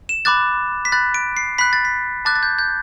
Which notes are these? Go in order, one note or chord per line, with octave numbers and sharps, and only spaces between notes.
E7
B5 D6 F#6 A6
B6
B5 F#6 A6
D7
C7
B5 F#6 B6
A6
B6
A5 D6 F#6 A6
A6
G6
G6